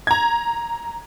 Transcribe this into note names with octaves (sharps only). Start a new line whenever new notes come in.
A#5 G#6